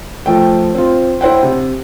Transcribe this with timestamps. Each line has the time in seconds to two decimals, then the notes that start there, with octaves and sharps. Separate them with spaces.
0.26 F3 A3 G5
0.75 C4 F4
1.21 E4 C5 F#5 G5
1.43 C3